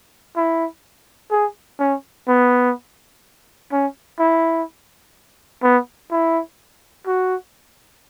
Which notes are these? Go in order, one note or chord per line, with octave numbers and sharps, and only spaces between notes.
E4
G#4
C#4
B3
C#4
E4
B3
E4
F#4